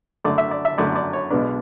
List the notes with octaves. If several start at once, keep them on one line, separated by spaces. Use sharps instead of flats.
F#2 D3 A3 D5
E5
D5
E5
F#2 D3 A3 D5
D5
C#5
B1 B2 G#3 B3 D4